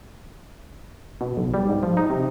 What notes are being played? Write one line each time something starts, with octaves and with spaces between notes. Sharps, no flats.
B2
B1
G3
G#2
F3
D#4
C3